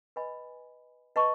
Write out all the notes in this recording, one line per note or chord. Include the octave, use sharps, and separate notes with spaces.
B4 D#5 G#5 B5
B4 D#5 A5 C#6